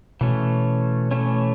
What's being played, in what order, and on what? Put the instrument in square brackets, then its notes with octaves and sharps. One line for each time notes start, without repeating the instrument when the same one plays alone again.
[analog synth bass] B2 [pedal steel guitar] E3 A3 C#4
[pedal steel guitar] E3 A3 C#4